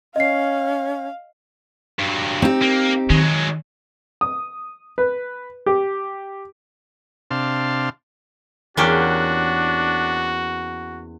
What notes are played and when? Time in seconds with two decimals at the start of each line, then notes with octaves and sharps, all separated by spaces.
0.16 C#4 D#5 F5 C7
1.99 G2 F#3
2.42 C4 D#4 G4
2.62 A#3
3.10 D#3 F#3 G#3
4.21 D#6
4.98 B4
5.66 G4
7.31 C3 D4 F5 A5 C6
8.77 E2 A#3 C#4 D4 F#4 G4